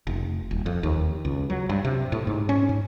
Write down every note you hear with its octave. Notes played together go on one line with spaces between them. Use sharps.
F1
D#1
F2
D#2
C#2
F#3
G2
C3
A2
G#2
C#4
G#2